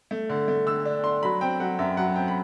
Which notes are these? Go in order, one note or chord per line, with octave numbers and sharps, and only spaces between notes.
A3
D3
A3
D3 E6
D4
D4 C6
F#3 B5
C4 G5
F#3 F#5
F#2 E5
F#3 F#5
C4 G5
B5